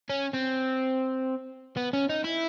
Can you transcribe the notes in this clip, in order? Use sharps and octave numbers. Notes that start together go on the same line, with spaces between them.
C#4
C4
B3
C#4
D#4
E4